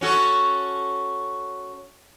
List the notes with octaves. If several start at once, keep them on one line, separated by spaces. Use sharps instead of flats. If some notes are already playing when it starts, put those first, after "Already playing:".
C#4 F#4 A4